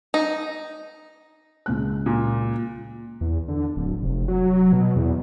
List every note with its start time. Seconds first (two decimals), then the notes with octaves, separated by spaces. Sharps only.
0.14 D#4
1.66 C#2 G#3 F#6
2.06 A#2
3.21 E2
3.48 D3
3.76 D1
4.02 F1
4.28 F#3
4.72 B2
4.96 E2